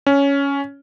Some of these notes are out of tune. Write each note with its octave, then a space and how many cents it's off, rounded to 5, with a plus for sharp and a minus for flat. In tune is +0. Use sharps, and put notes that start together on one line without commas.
C#4 +10